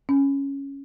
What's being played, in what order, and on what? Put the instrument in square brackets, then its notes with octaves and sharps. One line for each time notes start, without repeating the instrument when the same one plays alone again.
[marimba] C#4